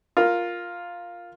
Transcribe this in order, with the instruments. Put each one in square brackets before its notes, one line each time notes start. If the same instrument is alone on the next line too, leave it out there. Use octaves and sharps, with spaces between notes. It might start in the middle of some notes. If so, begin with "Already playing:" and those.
[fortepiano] F4 A#4